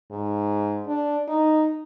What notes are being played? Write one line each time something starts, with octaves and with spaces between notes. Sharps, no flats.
G#2
D4
D#4